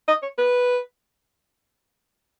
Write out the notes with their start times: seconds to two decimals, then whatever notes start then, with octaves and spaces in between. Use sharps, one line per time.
0.08 D#5
0.22 C#5
0.38 B4